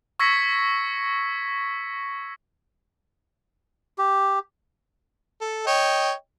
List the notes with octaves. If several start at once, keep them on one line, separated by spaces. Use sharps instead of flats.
C#6 E6 G#6 A#6 B6 C#7
G4
A4
C#5 D#5 G5